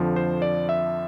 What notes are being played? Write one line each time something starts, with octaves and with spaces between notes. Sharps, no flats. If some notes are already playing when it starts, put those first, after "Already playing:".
Already playing: F2 D3 F3
C5
D5
E5